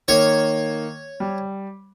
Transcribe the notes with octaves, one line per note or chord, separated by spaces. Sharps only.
D#3 A#3 C#5
G3